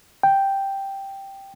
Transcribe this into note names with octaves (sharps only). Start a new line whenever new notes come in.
G5